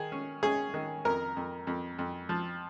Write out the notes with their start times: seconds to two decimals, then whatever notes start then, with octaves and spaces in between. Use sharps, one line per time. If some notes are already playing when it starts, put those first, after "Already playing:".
Already playing: D#3 G#4
0.12 C#4
0.43 C#4 G#4
0.74 D#3
1.05 F2 A#4
1.37 F2
1.67 F2
1.99 F2
2.29 F3